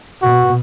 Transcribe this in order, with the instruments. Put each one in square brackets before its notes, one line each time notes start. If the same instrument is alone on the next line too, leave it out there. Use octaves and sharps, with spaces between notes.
[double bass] B2 [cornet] F#4